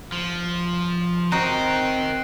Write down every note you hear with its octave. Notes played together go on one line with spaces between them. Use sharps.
F3
C4 D#4 F#4 A#4 D#5 F#6 C7 D7